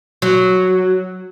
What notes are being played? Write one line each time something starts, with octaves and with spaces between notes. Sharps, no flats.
F#3